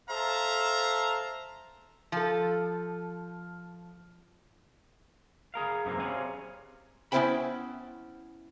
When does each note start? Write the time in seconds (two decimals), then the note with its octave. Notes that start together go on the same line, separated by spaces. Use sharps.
0.10 A4 C5 E5 F5 A5 A#5
2.12 F3 A4
5.54 G#4 A#4 F5
5.85 F#2 C3 E3 A#3
6.00 C3 C4 G#4 C#5 F5 G#5
7.12 B3 C#4 E4 C5 G5 B5